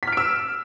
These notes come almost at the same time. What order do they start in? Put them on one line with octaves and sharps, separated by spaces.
B6 F6 D7 E6